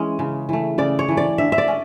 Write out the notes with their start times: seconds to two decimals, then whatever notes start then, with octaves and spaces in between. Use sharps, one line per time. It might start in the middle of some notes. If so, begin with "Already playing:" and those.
Already playing: E3 G#3 C#4
0.19 C#3
0.49 E3 A3
0.78 C#3 D5
0.99 C#5
1.08 E3 A3
1.17 D5
1.38 D3 E5
1.52 E5
1.58 D5
1.68 C#4